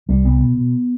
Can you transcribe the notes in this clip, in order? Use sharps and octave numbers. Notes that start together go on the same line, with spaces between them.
C2 G3
C2 B3
B2
B2